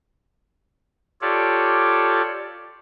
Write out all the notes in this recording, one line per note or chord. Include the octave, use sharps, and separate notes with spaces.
F4 G4 A4 C#5 D5